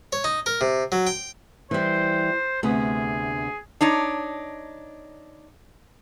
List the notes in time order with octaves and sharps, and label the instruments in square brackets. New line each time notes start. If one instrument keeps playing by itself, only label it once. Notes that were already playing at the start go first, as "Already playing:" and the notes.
[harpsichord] C#5
D#4
A#4
C3
F#3
G5
[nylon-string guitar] E3 G3 [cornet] C5
[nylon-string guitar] D2 C3 B3 [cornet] G#4
[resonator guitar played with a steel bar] D4 D#4 C#5